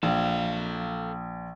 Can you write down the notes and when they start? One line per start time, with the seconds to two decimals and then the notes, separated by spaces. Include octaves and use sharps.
0.03 A#1 A4 F5